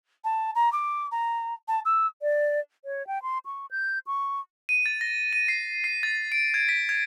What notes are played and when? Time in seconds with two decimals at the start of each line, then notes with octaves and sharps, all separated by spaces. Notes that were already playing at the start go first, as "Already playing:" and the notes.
0.24 A5
0.55 A#5
0.72 D6
1.11 A#5
1.68 A5
1.85 E6
2.21 D5
2.85 C#5
3.07 G5
3.23 C6
3.46 C#6
3.71 G6
4.07 C#6
4.69 D#7
4.86 A6
5.01 A#6
5.33 D#7
5.48 C7
5.84 C7
6.03 A6
6.32 D7
6.54 G#6
6.69 B6
6.89 G#6